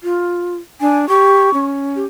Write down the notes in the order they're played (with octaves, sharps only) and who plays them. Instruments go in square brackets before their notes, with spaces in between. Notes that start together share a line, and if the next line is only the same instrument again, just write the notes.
[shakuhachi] F4
[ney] D4 [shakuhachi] G#5
[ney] G4 [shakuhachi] C#6
[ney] C#4
[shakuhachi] G4